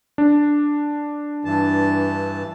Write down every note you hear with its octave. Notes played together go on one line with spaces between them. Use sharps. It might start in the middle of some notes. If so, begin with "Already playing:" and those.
D4
G2 E3 A5